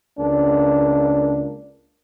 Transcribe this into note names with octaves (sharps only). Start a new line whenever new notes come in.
C#2 A#3 D4